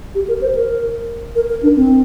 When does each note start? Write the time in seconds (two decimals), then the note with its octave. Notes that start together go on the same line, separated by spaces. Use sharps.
0.15 G4
0.28 A#4
0.41 C5
0.55 A#4
1.35 A#4
1.49 A#4
1.63 D4
1.76 C4